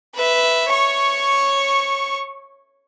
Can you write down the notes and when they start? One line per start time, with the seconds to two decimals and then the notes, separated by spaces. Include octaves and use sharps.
0.15 B4 E5
0.68 C#5 C#6